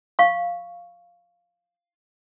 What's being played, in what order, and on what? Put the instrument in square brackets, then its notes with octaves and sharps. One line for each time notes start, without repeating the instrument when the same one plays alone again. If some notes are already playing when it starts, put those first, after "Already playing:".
[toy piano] F5 C#6